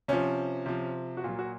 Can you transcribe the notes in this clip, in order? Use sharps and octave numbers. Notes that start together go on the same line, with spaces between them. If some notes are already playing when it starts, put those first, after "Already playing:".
C3 F3 C#4
C3 F3
F#4
A#2 F#3 F4
F#4